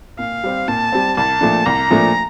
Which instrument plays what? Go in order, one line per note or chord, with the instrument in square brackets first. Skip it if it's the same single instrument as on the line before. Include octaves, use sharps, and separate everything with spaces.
[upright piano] A#2 [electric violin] F5
[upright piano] G3 C4
[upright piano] A#2 [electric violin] A5
[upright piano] G3 C4
[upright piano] C2 [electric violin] A5
[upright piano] A#2 F3 A3 D4
[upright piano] C2 [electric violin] A#5
[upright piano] A#2 F3 A3 D4